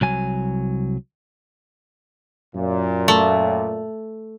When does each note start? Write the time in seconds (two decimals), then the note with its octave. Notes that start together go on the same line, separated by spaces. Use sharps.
0.01 C2 F#3 G#5
2.54 F#2 A#2
3.08 A3